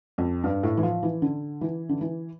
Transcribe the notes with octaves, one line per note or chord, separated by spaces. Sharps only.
F2
G2
A2
E3
F3
E3
D3
E3
D3
E3